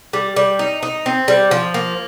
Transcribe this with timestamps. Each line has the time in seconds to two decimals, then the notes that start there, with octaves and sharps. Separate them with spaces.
0.13 G3
0.36 G3
0.59 D#4
0.83 D#4
1.06 C4
1.28 G3
1.51 F3
1.74 A#3